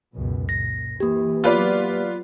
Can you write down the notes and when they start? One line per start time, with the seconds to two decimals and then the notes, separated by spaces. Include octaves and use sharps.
0.14 C#2 F#2 B2
0.49 A#2 A#6
1.00 E3 A#3 G4
1.44 F#3 B3 F4 B4 D5